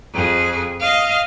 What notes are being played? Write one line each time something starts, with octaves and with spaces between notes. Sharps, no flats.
F2 G#4
D#5 F5